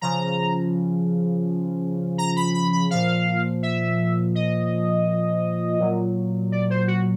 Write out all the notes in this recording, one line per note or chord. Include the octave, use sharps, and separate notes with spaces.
C#3 F3 A#5
A#5
B5
B5
B5
A#2 F3 F5
E5
D#5
A#2 F#3
D5
C5
F#4